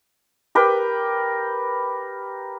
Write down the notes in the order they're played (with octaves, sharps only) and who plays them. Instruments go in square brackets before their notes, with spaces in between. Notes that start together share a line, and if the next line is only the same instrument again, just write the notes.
[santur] G4 A#4 B4 G5